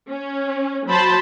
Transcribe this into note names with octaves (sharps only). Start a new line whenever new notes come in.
C#4
F#3 C5 A5 B5